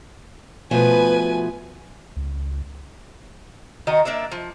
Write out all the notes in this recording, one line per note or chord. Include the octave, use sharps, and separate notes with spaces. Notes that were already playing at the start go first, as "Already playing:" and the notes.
B2 F3 A3 B4 G#5
C#2
D#3 F#4 D#5
A#3 D4 D5 E5
F3